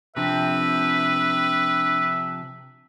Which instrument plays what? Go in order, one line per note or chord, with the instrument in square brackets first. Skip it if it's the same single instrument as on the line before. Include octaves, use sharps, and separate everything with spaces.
[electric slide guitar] C3 F3 C4 [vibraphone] D4 [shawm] B4 [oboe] E5